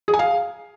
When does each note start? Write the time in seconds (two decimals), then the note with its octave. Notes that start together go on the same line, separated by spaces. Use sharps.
0.08 G#4
0.14 G#5
0.19 F5